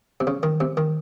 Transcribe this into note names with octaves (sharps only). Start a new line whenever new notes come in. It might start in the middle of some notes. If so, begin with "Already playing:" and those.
C3
C#3
D#3
C3
D#3